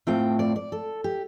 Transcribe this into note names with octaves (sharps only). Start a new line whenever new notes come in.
A2 A3 C4 F4 G5
D5
D5
A4
G4